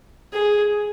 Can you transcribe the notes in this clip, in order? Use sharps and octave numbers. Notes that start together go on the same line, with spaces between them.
G#4